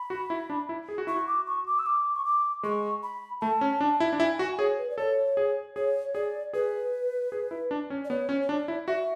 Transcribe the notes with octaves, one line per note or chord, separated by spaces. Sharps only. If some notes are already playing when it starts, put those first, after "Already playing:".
Already playing: B5
F#4
E4
D4
E4
G#4
F#4
E4 C#6
F#4
D6
C#6
D6
E6
D6
C#6
D6
G#3 C#6
B5
A3 A5
C#4
D4
E4
D4
E4 G#5
F#4 G#5
G#4 C#5
B4
D5
A4 C#5
G#4
G#4 C#5
G#4 D5
G#4 B4
G#4
E4
D4
C#4
D5
B3 C#5
C#4
C#5
D4 D5
E4
F#4 E5